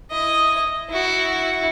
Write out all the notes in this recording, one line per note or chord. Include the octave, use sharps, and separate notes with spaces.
E4 D#5
E4 F#4